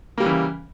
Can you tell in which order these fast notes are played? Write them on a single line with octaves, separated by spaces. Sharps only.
A#3 G3 C#3 E3